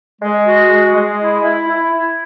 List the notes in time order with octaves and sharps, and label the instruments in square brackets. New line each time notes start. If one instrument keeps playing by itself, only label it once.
[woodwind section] G#3
F#4
G#3
G#3
E4
E4
E4
E4